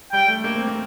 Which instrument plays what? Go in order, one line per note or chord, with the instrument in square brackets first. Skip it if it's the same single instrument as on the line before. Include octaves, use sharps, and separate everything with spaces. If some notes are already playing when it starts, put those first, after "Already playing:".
[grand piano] G3 [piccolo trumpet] G5
[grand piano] A3
A#3
C4
A#3